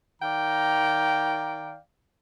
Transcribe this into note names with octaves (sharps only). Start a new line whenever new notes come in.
D#3 D5 F5 G5 A#5